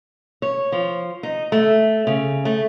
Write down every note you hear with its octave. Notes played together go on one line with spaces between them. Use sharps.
C#5
F3
D#4
A3
C#3
A3